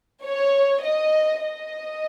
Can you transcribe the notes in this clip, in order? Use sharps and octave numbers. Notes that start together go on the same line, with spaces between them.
C#5
D#5
D#5